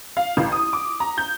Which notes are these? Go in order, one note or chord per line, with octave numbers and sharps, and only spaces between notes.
F5
A1
D#6
D6
A#5
G6